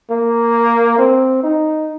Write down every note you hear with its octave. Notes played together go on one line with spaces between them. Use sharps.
A#3
C4
D#4